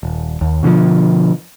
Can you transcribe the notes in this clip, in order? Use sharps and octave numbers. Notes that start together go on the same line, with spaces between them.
D#1
D#2
B2 D3 E3 F3